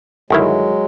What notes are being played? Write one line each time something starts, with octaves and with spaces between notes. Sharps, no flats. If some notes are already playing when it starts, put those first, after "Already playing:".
G1 D#3 F#3 G#3 E4